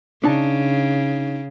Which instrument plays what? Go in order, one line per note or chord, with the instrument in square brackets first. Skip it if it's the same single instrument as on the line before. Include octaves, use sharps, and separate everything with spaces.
[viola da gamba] C#3 [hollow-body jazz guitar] D4 D#4 A5